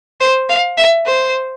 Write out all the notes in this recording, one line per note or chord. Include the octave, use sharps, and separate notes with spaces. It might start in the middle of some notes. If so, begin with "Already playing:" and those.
C5
F5
E5
C5